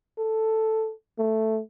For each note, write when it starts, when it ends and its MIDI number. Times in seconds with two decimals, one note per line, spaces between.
0.18 0.92 69
1.19 1.60 57